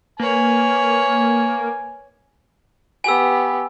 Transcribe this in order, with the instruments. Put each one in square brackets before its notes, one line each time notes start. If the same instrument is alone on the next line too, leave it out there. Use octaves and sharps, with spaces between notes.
[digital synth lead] A#3 [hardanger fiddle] B4 C#5 [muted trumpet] G#5
[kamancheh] B3 G4 [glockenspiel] G#5 E6